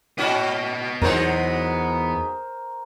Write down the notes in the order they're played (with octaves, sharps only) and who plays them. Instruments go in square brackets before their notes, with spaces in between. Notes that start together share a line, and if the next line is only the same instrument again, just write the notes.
[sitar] G#2 C#4 F#4 [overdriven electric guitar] B3 D#5
[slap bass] E2 [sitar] F#3 G#3 D#4 [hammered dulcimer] A#4 C5